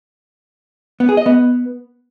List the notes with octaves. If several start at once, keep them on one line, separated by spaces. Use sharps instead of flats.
B3
G#4
D#5
B3